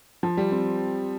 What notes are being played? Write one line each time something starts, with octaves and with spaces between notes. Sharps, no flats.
F3
G3
C4